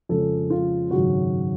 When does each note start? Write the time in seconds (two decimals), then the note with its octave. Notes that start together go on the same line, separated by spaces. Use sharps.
0.09 F2 C#3 G#3 C#4 A4
0.50 F4
0.91 G#1 F#2 C#3 F#4